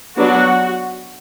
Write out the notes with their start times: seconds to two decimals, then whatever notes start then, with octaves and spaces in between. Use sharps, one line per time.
0.17 F#3 B3 D4 F#4